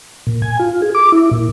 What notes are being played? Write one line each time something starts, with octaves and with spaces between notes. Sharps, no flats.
A#2
G#5
F4
G#4
D6
E4
A#2